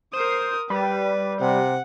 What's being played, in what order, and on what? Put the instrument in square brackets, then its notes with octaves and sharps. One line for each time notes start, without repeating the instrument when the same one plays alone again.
[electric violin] A#4 D#6 [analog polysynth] C5
[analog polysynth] G3 [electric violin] B4
[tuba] C3 [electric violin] F#5